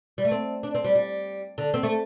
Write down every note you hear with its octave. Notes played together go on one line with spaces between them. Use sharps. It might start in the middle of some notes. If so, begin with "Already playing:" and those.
G3
A3
C4
D4
C4
G3
G3
D3
C4
A3